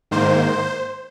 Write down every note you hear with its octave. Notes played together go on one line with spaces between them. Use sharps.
G#2 D#3 A#3 C5